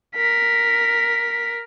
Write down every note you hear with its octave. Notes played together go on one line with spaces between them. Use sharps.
A#4 B6